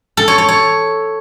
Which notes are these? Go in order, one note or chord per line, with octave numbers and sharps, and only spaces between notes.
A4
C#5
C#5
C#5